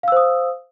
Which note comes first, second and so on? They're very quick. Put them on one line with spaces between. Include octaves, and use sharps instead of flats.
F5 E6 C5 D#6